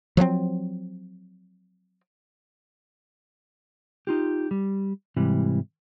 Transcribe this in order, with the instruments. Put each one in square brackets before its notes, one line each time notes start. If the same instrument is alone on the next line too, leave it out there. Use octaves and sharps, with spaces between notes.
[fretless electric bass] F3 F#3 A3 C4
[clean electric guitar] D#4 F4 G4
G3
G#2 C3 E3 G3